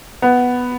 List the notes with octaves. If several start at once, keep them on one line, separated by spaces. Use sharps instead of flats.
B3